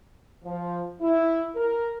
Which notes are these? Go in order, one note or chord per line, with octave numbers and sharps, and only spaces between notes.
F3
E4
A#4